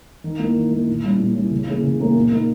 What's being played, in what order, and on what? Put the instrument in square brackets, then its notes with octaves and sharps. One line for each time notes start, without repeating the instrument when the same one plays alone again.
[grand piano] D#3
A#3 E4
D#3
A#3 E4
A#2
G3 C#4 E4
A#2
G3 C#4 E4
C#3
E3 A#3 C#4 G#4
C#3
E3 A#3 C#4 G#4
A#2
A#3 D#4